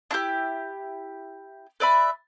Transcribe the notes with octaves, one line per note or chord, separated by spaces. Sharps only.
D4 E4 G4
B4 D5 E5 B5